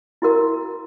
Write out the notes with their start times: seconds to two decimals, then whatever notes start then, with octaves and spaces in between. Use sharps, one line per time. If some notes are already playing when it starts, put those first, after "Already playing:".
0.22 E4 F#4 A#4